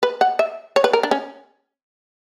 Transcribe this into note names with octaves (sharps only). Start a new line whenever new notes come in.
B4
F#5
E5
C#5
B4
A#4
D4
C#4